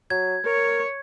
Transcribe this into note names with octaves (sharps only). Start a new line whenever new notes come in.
F#3 G#6
A#4 C#5